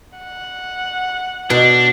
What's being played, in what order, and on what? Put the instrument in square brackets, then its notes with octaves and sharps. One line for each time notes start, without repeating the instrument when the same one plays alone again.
[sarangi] F#5
[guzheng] B2 [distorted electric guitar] D4